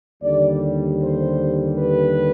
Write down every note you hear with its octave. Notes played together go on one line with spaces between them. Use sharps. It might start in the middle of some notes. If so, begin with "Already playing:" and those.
D#2 D3 G3 D5
C5
B4